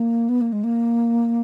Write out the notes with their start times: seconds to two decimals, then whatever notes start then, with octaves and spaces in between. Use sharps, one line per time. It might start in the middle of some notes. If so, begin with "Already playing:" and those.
Already playing: A#3
0.29 B3
0.41 A#3
0.53 G#3
0.64 A#3